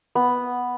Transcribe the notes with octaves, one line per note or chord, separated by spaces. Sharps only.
B3